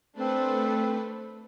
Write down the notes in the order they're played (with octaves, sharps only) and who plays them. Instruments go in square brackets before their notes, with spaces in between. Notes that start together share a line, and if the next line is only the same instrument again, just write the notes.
[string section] A3 [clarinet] C4 [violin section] D4 B4 C5